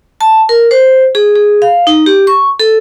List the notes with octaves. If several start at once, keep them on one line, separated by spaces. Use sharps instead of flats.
A5
A#4
C5
G#4
G#4
F5
D#4
G4
C#6
A4